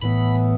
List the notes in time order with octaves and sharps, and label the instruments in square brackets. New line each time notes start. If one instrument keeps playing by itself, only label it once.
[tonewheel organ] A2 E3 B3 B5